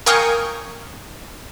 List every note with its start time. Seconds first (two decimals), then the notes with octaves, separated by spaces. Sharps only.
0.06 A#4 F5 G5 G#5 C#6 D#6